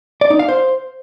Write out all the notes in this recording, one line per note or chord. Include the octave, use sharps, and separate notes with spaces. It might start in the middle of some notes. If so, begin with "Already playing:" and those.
D5
D#4
F5
C5